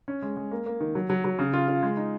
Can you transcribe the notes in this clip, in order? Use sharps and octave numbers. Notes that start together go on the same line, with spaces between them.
C#4
G#3
G#3
A#3
A#3
D#3
F#3
F#3
F#3
C#3
F4
F4
G#3
D#4